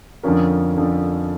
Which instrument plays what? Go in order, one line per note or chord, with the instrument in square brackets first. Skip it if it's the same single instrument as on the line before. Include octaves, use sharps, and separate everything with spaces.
[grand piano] F2 D3 F3 C#4 A#4
F2 D3 F3 C#4